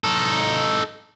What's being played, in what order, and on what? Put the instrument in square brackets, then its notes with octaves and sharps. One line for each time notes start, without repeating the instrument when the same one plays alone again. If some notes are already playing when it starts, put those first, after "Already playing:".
[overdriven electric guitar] D#4 A4